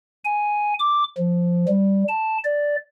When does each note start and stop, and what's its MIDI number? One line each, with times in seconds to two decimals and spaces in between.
0.24 0.73 80
0.79 1.04 86
1.17 1.65 53
1.68 2.04 55
2.08 2.37 81
2.44 2.76 74